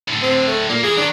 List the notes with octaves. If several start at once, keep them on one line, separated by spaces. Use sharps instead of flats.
A2 D3
C4
A3
A#2 A#3
E3 G#4
D#3 F#3 D4